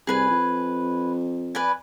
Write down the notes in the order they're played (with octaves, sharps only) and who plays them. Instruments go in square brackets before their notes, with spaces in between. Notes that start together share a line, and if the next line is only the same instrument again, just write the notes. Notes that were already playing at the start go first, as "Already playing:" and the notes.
[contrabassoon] C2 [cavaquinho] G#4 B4 G#5
[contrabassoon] F2
[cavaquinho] B4 D5 G#5